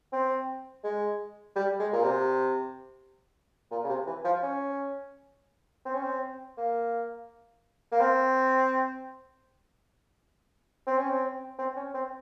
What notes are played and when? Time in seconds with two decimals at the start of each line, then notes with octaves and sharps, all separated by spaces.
0.13 C4
0.84 G#3
1.56 G3
1.80 G#3
1.92 A#2
2.04 C3
3.71 A#2
3.84 C#3
3.89 C3
4.06 E3
4.24 F3
4.43 C#4
5.85 C4
5.94 C#4
6.03 C4
6.57 A#3
7.92 A#3
8.00 C4
10.87 C4
10.98 C#4
11.09 C4
11.58 C4
11.76 C#4
11.94 C4